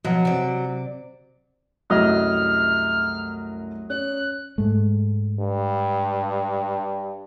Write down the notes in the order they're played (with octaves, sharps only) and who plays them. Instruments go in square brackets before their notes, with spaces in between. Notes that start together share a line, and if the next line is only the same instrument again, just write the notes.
[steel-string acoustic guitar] B2 F3 [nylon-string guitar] F#3
[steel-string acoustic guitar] C3 D5
[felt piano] C2 F#2 G3 [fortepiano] F#3 D#5 [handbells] A3 [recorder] F6
[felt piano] C#4 [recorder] F#6
[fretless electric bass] G#2 G#3 A3
[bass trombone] G2